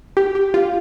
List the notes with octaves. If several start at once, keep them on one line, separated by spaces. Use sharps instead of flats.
G4
G4
F4